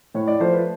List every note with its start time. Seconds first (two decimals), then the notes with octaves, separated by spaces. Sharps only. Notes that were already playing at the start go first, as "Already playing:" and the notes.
0.14 A2 C#5
0.28 D5
0.40 F3 A3 C5
0.53 B4